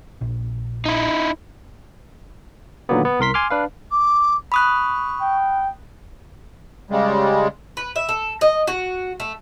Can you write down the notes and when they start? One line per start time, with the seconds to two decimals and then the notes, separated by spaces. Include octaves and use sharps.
0.21 A#1
0.86 D#4 E4
2.89 A#2 D3 D#3 F#3 A#3 B3
3.05 B3
3.19 C2 A#4 C6 B6
3.34 G#5 C6 D6 F6
3.50 D4 B4 F5
3.91 D6
4.52 B5 C#6 D#6 F#6
5.21 G5
6.90 C#3 G3 G#3
7.77 B4
7.96 E5
8.09 A4
8.41 D#5
8.67 F#4
9.20 A3